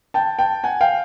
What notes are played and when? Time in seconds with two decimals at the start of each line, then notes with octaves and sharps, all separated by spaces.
0.14 G5 A5
0.39 G5 A5
0.64 F#5 G#5
0.81 F5 G5